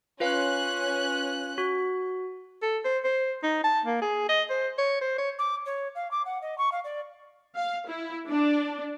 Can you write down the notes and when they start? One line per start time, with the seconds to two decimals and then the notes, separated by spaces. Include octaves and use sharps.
0.20 C#4 F4 B4 F5 F#6
1.58 F#4
2.62 A4
2.85 C5
3.04 C5
3.43 D#4
3.64 A5
3.85 A#3
4.01 G#4
4.29 D#5
4.50 C5
4.78 C#5
5.01 C5
5.18 C#5
5.39 D6
5.66 C#5
5.95 F5
6.11 D6
6.25 F#5
6.42 D#5
6.58 C#6
6.72 F5
6.84 D5
7.55 F5
7.87 E4
8.27 D4